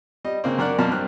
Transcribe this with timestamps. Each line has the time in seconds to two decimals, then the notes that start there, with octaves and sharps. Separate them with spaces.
0.24 G3 D#5
0.44 C#3 A#3 C4
0.59 F#2 D4 A#4 D5 F#5 F#6
0.79 F#2 B2 A#3 A5 F6
0.91 G2 C4 F6 F#6